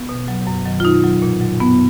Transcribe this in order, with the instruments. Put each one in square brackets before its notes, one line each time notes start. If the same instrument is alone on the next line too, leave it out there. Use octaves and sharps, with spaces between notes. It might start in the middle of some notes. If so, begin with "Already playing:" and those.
Already playing: [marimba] B3
B2
F#3
F#2
D#3 F#3
F4
B2 D#4
F#3
A#2
F#3
F#2 B3